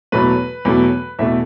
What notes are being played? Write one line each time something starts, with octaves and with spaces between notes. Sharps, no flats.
E2 B2 F#3 A3 B4
E2 B2 F#3 A3
E2 B2 A3 E5